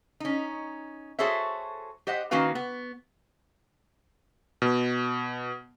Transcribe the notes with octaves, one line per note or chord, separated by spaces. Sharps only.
C#4 D#4
F#4 G#4 A4 C5 C#5 E5
G4 C5 D#5 F#5
D#3 A#3 C#4 F#4 B4 F5
B3
B2